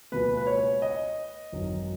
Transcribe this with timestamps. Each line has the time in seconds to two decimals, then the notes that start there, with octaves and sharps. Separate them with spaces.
0.12 C#2 B2 A#3 B4
0.37 B4
0.47 C#5
0.82 D#5
1.52 G#1 F#2 D#3 F#3